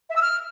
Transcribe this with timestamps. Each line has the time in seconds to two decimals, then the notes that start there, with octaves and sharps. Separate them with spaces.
0.10 E5
0.16 E6
0.21 F6